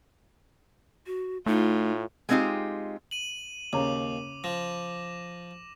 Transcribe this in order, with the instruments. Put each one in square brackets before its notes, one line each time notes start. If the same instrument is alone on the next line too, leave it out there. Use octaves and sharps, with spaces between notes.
[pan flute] F#4
[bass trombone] A2 [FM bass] A3 [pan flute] D#4 [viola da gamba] F4
[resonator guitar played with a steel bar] G#3 B3 C4 D#4 F4 G4
[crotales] D#7 F#7
[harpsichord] D#2 [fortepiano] C#3 C#5 A#5 [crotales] D6
[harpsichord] F3 [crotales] A#6 E7